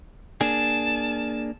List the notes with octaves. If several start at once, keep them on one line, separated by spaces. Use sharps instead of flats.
A#3 D4 G#4 A5